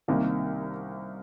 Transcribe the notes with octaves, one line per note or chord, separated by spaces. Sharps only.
C2 C3 D#3 A#3